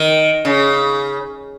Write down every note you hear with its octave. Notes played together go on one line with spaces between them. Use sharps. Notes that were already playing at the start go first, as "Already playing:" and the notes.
Already playing: D#3
C#3